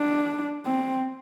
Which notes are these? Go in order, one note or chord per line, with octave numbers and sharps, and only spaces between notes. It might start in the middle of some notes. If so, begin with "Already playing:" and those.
Already playing: D4
C4